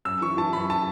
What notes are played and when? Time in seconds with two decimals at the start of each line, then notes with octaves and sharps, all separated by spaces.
0.05 F#2 E6
0.21 E3 C#6
0.37 E3 A5
0.53 F#2 B5
0.70 A5